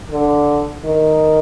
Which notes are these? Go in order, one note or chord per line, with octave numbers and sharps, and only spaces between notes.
D3
D#3